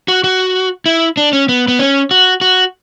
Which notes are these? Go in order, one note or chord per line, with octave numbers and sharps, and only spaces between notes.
F#4
F#4
E4
D4
C#4
B3
B3
C#4
F#4
F#4